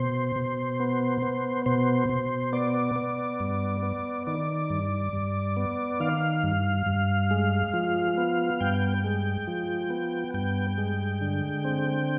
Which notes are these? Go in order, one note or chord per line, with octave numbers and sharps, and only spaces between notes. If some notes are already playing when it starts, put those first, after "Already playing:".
Already playing: B2 C5
B2
B3
B3
B2 C5
B2
B3 D5
B3
G2
B3
D#3 D5
G2
G2
B3
D#3 F5
G2
G2
G#3
F3
B3
G2 G5
G#3
F3
B3
G2 G5
G#3
D3
C4